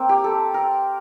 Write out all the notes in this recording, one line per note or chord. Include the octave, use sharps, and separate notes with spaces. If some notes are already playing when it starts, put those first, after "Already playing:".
Already playing: A#3 C4
G4
A4
A#4